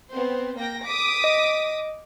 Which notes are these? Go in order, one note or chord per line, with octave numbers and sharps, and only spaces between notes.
B3 C4 C5
A#3 G5 A#6
D6 D#6 B6
D#5